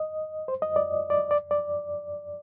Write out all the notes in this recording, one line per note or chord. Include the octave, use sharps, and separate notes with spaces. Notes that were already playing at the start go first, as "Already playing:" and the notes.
Already playing: D#5
C5
D#5
D5
D5
D5
D5